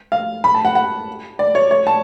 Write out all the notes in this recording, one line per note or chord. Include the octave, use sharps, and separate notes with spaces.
F5
B5
A5
F#5
F#5
D5
C#5
C#5
A5